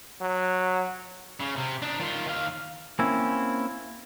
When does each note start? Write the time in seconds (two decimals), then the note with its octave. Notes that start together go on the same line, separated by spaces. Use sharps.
0.21 F#3
1.40 C#3
1.56 C3
1.82 D4 D#4
2.00 D#3 F4
2.26 D#3 F5
2.99 A#3 C4 C#4 E4